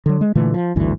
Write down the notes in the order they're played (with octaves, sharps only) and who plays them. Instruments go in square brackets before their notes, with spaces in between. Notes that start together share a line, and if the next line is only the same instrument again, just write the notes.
[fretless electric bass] D3 F#3
G#3
A#2 D3 E3 A3
F3
G#1 D2 G2 E3